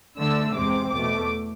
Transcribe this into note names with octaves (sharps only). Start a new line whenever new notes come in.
D3 A3 D4 E6
E2 C3 G#3 C4 D6
E2 B2 A3 D6